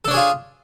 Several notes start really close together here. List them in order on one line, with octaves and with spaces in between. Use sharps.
A4 D4 C#5 G#4 F4